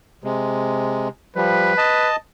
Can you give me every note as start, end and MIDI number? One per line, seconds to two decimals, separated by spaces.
0.24 1.08 48
0.24 1.08 56
1.36 1.73 53
1.36 1.73 55
1.36 2.09 71
1.78 2.16 75
1.78 2.16 81